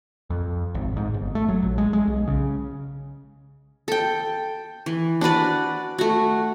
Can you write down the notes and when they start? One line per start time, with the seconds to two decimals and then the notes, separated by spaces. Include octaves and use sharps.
0.30 F2
0.75 G#1
0.97 G#2
1.14 G1
1.35 A3
1.48 F#3
1.62 A#1
1.78 G#3
1.93 G#3
2.07 B1
2.28 C#3
3.88 A4 G5
4.86 E3
5.21 D4 F#4 B4 D5
5.98 A3 F#4